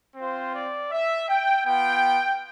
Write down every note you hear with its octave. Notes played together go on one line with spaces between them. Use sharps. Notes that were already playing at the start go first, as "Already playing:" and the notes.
C4 F4 C5
D5
E5
G5
B3 F4 G5